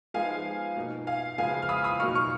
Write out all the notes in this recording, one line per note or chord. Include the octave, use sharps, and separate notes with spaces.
F3 G#3 B3 D#4 F5 G#5
B2 A#3 D#4
F5 G#5
C#3 F3 G#3 B3 F5 G#5
F6
B5 D#6
B5 D#6
B2 F#3 A#3 D#4 C#6 F6
C#6 F6